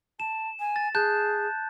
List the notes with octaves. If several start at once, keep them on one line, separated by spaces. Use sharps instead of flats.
A5 E7
G#5
A6
G#4 A5 F#6 G6